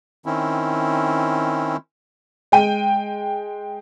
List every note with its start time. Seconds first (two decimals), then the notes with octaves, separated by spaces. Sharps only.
0.26 D#3 C4 C#4 E4
2.52 G#3 G5 D#7